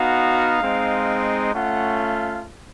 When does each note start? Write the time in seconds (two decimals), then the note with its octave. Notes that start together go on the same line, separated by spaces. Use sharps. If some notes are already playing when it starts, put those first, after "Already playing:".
Already playing: B3 D#4 F#4 F5
0.61 G#3 C4 D#4
1.53 A3 C#4 F4 F#5
1.99 F5